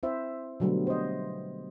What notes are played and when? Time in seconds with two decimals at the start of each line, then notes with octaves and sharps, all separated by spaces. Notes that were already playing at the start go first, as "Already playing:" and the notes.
0.03 C4 E4 C5 E5
0.60 B2 D3 F#3 G3 A3 B3
0.87 C5 D#5